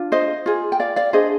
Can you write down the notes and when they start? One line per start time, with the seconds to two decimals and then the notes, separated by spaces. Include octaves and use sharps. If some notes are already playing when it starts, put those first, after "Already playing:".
Already playing: D4 F4
0.12 C5 D#5
0.46 F4 G#4
0.72 G5
0.80 D5 F5
0.96 D5 F5
1.13 D4 G#4 C5 D#5